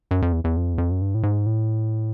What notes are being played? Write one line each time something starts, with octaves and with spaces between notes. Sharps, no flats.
F#2
F2
E2
E2
F2
E2
F2
F#2
G2
A2
G#2
A2